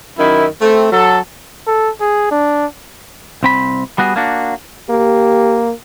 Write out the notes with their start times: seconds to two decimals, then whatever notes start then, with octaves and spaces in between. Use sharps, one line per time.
0.17 F#2 D#3 E4
0.61 A3 C4
0.91 F#3 A4
1.67 A4
2.01 G#4
2.31 D4
3.43 C2 C4 B5
3.98 G3 B3 F#4 G#4
4.16 A#3 D4 F#4
4.89 A#3 G4